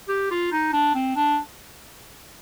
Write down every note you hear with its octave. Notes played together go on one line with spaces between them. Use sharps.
G4
F4
D#4
D4
C4
D4